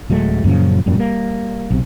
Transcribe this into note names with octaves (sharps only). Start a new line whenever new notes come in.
D1 F#3 G#3 A3
F#2 A#2 C#3 F3
E1 F#2 A#2 G3
G3 A#3
B1 C3